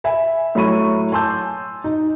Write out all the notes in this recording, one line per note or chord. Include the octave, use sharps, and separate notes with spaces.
E5 G#5 B5
A2 F#3 E4 B5 C#6 D#7
G#5 A5 C6 D6 E6 G6
D#4